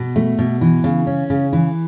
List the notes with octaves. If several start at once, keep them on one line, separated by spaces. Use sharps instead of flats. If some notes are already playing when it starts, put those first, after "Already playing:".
Already playing: B2
A3
B2
E3
C#3
C#4
C#3
E3